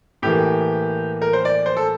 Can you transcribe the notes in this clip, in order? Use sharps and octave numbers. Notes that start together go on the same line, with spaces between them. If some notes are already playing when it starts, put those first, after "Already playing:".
A2 E3 A#3 G4
A#4
C5
D5
C5
A4